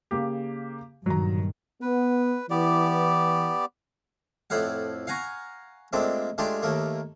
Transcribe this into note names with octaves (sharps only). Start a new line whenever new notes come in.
C#3 A#3 G4
G2 A#2 D#3 F#3 A#5
B3 B4
E3 B3 G4 D5
F2 A2 E4 F5 F#5
F5 F#5 G#5 A#5 C#6
A#2 G#3 A3 C4 D4
G#3 A3 D4 F4 G4 D5
D#2 D#3 A3 A#3